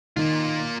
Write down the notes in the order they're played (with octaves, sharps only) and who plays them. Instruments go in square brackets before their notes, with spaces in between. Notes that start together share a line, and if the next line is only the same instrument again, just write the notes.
[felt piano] D#3 [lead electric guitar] A#3 F4